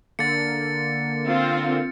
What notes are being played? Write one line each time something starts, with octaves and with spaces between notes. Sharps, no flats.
D3 A#3 A6 C#7
C4 F4